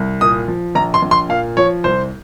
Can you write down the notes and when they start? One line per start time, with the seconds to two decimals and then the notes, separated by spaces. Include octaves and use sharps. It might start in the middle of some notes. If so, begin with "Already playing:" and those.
Already playing: C2
0.21 A#2 D#6
0.48 F3
0.75 A#1 A#5
0.94 C6
1.02 A#1
1.11 C6
1.29 A#2 F5
1.57 F3 C#5
1.84 C2 C5